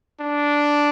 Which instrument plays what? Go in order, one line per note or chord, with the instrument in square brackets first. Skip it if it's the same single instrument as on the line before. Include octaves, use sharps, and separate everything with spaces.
[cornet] D4